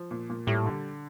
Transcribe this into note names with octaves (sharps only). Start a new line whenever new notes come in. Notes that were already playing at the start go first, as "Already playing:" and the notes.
Already playing: F3
A#2
A#2
A2 G3
D3